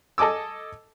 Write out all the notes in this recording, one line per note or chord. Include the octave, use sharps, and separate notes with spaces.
A4 D#5 G#5 D6 E6